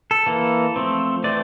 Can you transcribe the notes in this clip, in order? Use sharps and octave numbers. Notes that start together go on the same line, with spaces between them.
A4
E3 A#3
F3 A3 C4
E3 A3 C4 D5